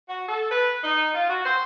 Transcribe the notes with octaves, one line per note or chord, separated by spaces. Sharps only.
F#4
A4
B4
D#4
F4
F#4
C5